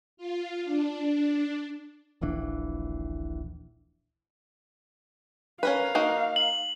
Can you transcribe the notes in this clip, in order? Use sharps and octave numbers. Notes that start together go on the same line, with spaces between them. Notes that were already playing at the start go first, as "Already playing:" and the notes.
F4
D4
D#1 A#1 E3 D4
C#4 A#4 B4 F5
A#3 D#4 F#4
F#7